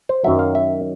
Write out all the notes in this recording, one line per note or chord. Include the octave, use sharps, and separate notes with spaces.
C5
F#2 D#3 F#3 E5
F5
E5